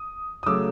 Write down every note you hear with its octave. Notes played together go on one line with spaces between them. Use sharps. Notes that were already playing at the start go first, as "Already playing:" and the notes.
Already playing: D#6
D#6
C#3 F#3 A3 D6 E6